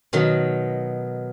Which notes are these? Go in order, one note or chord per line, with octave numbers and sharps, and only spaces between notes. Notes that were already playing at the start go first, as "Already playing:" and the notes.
B2 D#3 F#3